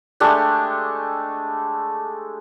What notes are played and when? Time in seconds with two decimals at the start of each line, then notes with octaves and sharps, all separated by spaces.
0.20 G#3 A3 D4 G4